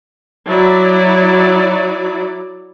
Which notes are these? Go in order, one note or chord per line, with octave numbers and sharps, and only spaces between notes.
F#3 E4 D5